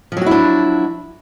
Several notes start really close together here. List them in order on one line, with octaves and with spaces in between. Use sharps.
F3 F#3 F#4 E4 D4